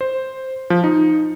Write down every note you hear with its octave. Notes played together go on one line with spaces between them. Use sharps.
C5
F3
D#4